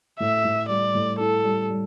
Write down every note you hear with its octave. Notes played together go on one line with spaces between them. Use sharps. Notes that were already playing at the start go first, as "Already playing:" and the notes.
A2 E5
A2
G3 D5
A2
E4 A4
G3
G3